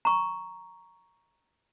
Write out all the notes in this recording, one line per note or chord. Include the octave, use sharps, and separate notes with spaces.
A#5 C#6